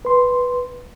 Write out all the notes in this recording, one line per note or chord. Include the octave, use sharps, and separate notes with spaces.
B4 C6